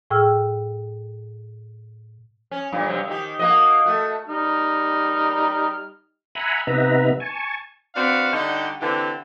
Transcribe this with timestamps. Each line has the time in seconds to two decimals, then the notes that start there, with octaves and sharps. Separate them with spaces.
0.11 A2 G#4 G5 E6 F6
2.51 C#4
2.73 G2 A#2
2.86 G2 C3 F#3
3.08 D#3 G4
3.39 A#3 F#4 D#5
3.86 A3 F#4
4.28 G3 D#4 F6
6.35 E5 F#5 G#5 A#5 B5
6.67 C3 B3 D#4 B4 E5 A#5
7.20 G#5 A5 C#6
7.95 C4 D4 F#4 B4 F5
8.32 D3 G3 D#4 F#4 G4
8.80 D3 E3 C4 G4